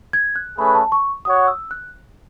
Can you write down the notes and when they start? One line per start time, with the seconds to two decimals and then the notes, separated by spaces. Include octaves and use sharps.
0.13 G#6
0.36 F#6
0.58 A3 C#4 G#4 B4 B5
0.75 A5
0.92 C#6
1.25 F#4 C#5 F#5 D#6
1.48 E6
1.71 F#6